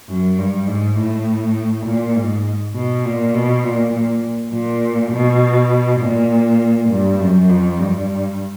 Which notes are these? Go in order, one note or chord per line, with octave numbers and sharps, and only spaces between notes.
F#2
G2
G#2
A2
A#2
G#2
B2
A#2
B2
A#2
A#2
A#2
B2
A#2
G2
F#2
F2
G2